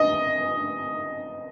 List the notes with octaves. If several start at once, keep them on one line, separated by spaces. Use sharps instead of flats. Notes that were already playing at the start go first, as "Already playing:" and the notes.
Already playing: D#5